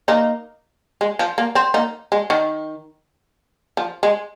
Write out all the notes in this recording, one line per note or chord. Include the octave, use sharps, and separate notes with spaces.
A#3 D#4
G#3
F3
A#3
C4
A#3 D#4
G#3
D#3
F3
G#3